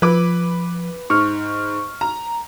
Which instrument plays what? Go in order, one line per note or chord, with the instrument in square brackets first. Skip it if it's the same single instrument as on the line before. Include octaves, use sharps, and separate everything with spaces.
[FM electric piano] F3 [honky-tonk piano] B4 D6
[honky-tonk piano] G#2 [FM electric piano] C#6 F6
[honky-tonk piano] A#5